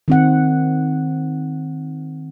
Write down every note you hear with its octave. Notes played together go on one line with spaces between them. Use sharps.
D#3 C4 F#5